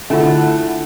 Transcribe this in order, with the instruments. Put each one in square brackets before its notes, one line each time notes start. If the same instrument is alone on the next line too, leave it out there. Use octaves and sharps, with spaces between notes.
[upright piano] D3 E4 [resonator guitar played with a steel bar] A3 [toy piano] D4 F4 [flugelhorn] F#5